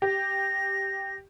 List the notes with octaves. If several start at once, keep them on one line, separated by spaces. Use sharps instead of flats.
G4 A#6